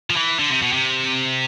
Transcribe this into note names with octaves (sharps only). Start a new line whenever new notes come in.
F3
E3
D3
C3
B2
C3